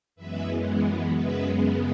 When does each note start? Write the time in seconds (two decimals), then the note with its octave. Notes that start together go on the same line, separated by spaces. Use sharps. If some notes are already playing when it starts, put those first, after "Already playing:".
0.16 F#2 E3 G#3 B3 B4 E5
1.13 F#2 C#3 G#3 B3 B4 E5